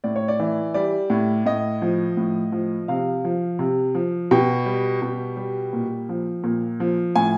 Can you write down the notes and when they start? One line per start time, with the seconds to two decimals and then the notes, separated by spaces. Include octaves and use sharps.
0.04 A2 D5
0.16 C#5
0.28 D5
0.40 E3
0.74 G3 D5
1.10 A2
1.46 A2 D#5
1.82 F3
2.17 A2
2.52 F3
2.88 C3 F5
3.25 F3
3.59 C3
3.95 F3
4.31 B2 G5
4.66 G3
5.02 B2
5.37 G3
5.73 A#2
6.09 F3
6.44 A#2
6.80 F3
7.16 A2 G#5